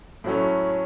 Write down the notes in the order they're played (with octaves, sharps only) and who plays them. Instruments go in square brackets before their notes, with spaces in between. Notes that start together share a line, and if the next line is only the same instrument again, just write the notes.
[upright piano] A2 F#3 A3 C#4